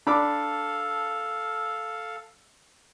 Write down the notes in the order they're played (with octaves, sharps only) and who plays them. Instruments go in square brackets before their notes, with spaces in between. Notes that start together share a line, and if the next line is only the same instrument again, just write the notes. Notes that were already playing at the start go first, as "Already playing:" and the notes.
[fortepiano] D4 B5 D6 [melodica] A4 F5